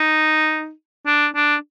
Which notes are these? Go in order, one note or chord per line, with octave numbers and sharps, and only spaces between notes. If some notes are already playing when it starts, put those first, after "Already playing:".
Already playing: D#4
D4
D4